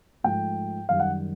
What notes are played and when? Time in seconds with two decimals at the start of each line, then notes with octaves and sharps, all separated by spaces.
0.24 G#2 F3 A3 G5
0.89 F#2 D#3 G3 F5
1.00 F#5